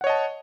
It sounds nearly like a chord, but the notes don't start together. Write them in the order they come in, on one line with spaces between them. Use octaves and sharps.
F#5 C#5 D#5 A5